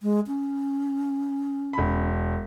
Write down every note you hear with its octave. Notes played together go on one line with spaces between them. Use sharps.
G#3
C#4
E1 B5